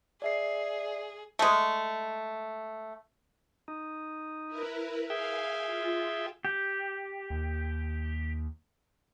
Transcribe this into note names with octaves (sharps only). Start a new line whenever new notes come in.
G#4 D5 E5 C7
G#3 A3
D#4
E4 A#4 B4
G#4 E5 F5 G5 G#5
F4
G4
D#2